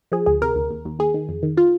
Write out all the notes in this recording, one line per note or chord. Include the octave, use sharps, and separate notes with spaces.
F3 G#4
D2 G#4
C3 A#4
D2
D#2
D#2
D#2 G#4
D#3
F2
D#3
F4